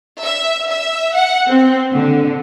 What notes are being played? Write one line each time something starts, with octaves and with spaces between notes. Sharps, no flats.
E5
E5
F#5
C4
D3